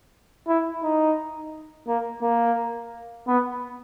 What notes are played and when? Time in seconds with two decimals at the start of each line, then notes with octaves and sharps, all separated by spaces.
0.48 E4
0.83 D#4
1.88 A#3
2.22 A#3
3.28 B3